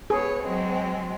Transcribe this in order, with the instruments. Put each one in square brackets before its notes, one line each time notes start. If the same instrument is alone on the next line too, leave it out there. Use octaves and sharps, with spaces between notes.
[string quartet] B3 C#5 [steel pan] G#4
[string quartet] F#3 G#3 C4